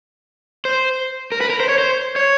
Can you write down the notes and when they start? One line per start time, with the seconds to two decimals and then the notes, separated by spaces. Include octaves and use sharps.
0.65 C5
1.32 A#4
1.41 B4
1.50 A#4
1.60 C5
1.69 C#5
1.78 C5
2.16 C#5